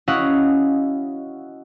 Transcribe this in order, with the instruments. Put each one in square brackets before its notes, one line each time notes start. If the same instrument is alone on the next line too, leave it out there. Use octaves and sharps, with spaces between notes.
[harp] C#4 E4 F#4 D#5 F5 F#5